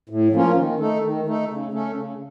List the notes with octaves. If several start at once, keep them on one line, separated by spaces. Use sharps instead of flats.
A2
F3 A#3 C#4 F4
D#3
A3 D#4 A4
D#3
A3 D#4 A4
C#3
A3 C#4 A4
C#3